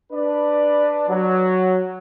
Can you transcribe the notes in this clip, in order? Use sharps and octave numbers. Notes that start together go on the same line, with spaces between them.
D4 B4 D5
F#3